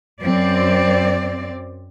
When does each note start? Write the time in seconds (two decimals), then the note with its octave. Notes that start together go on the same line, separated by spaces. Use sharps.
0.22 F#2 C4 D5